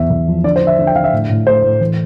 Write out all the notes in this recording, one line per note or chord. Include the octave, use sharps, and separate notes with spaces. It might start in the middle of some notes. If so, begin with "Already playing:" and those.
Already playing: E2 B3 E5
E2
F3
D3 D5
C5
D3
E5
D3
G5
D3 F5
E5
A2
A2
A3 C5
A2
E3